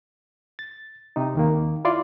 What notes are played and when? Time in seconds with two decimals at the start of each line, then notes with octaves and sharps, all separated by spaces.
0.59 A6
1.16 C3 D#4
1.35 D#2 D#3 A#3
1.85 E4 F4 D5 C6